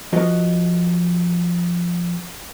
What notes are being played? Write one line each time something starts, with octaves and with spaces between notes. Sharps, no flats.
F3 F#4 A#4 B4 D#5